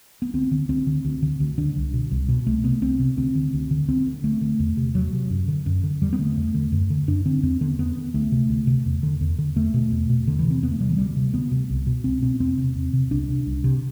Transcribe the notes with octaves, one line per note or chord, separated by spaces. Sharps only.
B3
D2 C4
D3
D2 C4
D3
D2
D3
D2
D3 D4
C2
B2
C2
B2
C2 A3
C3 B3
C2 C4
C3
D2 C4
D3
D2
D3
D2 C4
D3
D2 A3
D3
E2
C3
E2 F#3
C3
F#2
D3
F#2
D3
E2 G3
B3
D3 A3
E2
D3
F#2
D3
F#2 D4
D3 C4
E2 C4
D3 B3
E2 B3
D3
D2 A3
C3
D2
C3
E2
D3
E2
D3
E2 A3
B2
E2
B2
E2 D3
E3
C3
C4
E2 B3
A3
C3 G3
E3
D2 G3
C3
D2 B3
C3
C2
B2
C2 C4
B2 C4
E2 C4
C3
E2
C3
C2 D4
C3
C2
C3